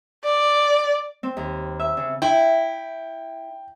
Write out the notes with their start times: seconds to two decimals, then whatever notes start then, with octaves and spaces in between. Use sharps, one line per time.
0.24 D5
1.23 C4
1.37 D#2
1.79 E5
1.97 C#3
2.22 E4 G5